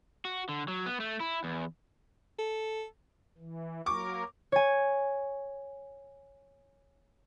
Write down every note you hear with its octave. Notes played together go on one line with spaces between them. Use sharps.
F#4
D3
F#3
B3
A3
E4
E2
A4
E3
F#3 A#3 A#4 C#6 D6
C#5 G#5